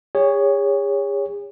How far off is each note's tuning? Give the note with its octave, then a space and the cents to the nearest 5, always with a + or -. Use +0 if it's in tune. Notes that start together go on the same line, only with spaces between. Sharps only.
G#4 -40 C#5 +10